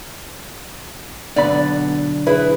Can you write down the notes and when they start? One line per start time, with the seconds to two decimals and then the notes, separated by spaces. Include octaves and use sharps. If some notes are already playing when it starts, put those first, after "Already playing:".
1.36 B1 D3 B3 D5 B5
2.27 E4 G#4 B4